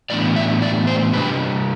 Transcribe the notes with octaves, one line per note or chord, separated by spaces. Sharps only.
A2 E3 B3 D4 D5
E5
D5
C5
C3 G3 D4 B4